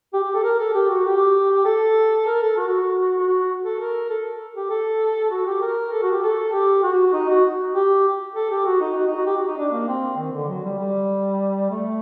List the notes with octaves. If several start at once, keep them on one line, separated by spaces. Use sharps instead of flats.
G4
G4
A4
A#4
A4
G4
F#4
G4
A4
A#4
A4
F#4
F#4
A4
A#4
A4
G4
A4
F#4
G4
A#4
A4
F#4
G4
A4
G4
F#4
D#4
F#4
G4
A4
G4
F#4
D#4
F#4
D#4
F#4
G4
F#4
D#4
D4
A#3
C4
D#3
D3
F#3
G3
G3
A3